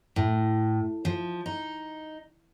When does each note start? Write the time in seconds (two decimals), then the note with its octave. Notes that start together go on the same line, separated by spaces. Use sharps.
0.16 A2
1.05 F3
1.46 D#4